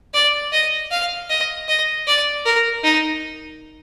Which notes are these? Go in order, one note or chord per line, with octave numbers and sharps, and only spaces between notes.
D5
D#5
F5
D#5
D#5
D5
A#4
D#4